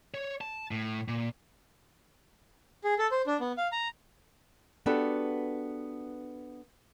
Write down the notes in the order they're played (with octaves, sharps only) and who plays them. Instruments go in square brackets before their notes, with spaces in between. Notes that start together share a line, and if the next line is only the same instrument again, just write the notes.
[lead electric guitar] C#5
A5
A2
A#2
[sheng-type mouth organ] G#4
A4
C5
D4
B3
F5
A#5
[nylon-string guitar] B3 D4 F#4 G4 A4 B4